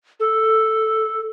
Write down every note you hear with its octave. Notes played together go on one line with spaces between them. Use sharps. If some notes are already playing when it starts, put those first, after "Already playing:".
A4